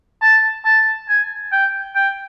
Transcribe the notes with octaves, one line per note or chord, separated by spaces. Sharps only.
A5
A5
G#5
G5
G5